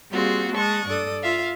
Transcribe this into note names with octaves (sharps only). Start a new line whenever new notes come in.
G3 A#3 C4 F4 F#4 G#4
G#3 A5 C#6 D#6 F#6
G2 A4 D5 D#6
F4 E5 F5